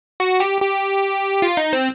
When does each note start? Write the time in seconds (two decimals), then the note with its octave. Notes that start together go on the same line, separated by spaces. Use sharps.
0.20 F#4
0.40 G4
0.61 G4
1.42 F4
1.57 D#4
1.73 C4